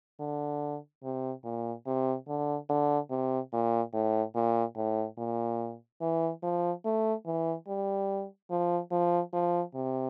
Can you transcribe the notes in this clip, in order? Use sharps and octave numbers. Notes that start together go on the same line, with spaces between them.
D3
C3
A#2
C3
D3
D3
C3
A#2
A2
A#2
A2
A#2
E3
F3
A3
E3
G3
F3
F3
F3
C3